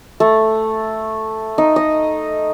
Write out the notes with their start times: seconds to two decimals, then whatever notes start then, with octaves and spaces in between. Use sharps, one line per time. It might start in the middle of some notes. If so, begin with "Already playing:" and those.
0.20 A3
1.58 D#4
1.76 D#5